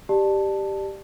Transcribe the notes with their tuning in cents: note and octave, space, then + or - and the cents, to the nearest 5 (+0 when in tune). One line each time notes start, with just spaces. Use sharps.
G4 +0 D5 +25 A5 +0